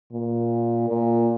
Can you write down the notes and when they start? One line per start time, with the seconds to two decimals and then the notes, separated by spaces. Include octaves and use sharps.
0.12 A#2
0.89 A#2